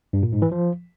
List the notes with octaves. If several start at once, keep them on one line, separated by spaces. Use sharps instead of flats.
G2
A#2
G#2
E3
F3